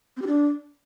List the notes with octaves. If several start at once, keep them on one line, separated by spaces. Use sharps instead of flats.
C4
G4
D4